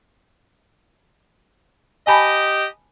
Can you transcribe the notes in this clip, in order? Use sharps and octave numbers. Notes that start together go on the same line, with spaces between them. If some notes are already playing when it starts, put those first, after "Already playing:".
G4 D#5 G#5 A5 B5